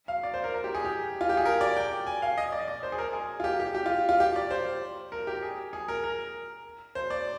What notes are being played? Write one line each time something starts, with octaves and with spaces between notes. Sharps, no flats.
F5
D5
C5
A#4
A#4
G4
G#4
G4
F4
G4
G#4
A#4
D5
G5
G#5
F5
D#5
D5
D5
C5
G#4
A#4
G#4
F4
G4
G4
G4
F4
F4
G4
D5
C5
A#4
G4
G#4
G#4
A#4
A#4
C5
D5